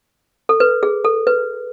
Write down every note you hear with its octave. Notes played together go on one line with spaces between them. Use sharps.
A4
B4
G#4
A4
B4